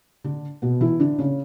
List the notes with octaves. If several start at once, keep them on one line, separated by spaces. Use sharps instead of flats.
D3 D4
B2 B3
E3 E4
D3 D4
C#3 C#4